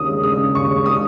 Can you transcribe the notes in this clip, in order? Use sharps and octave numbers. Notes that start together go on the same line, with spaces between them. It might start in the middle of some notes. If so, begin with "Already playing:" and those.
Already playing: D#2 C#3 C#4 D#6
G#3
C#3 D#6
C#4
D#2 C#6
G#3
C#3 D#6